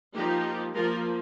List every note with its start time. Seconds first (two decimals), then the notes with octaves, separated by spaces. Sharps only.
0.14 F3 A#3 D#4 G4
0.74 F3 A#3 F4 A#4